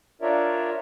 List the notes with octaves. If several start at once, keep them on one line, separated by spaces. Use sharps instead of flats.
D4 F4 A#4 C#5 D5 E5